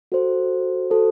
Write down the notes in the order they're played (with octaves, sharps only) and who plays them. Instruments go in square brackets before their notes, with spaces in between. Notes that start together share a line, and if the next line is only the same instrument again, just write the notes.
[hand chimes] F#4 A4 C5
F#4 A4 C5